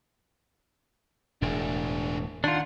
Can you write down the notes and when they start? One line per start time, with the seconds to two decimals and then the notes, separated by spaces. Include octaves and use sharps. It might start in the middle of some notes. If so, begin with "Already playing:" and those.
1.42 E1 A2 D4 G#4
2.44 D#3 D4 F4 F#5